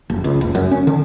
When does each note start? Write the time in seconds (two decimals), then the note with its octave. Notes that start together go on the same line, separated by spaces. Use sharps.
0.10 F#1
0.24 C#2
0.41 F#1
0.55 F#2
0.71 C#4
0.87 D3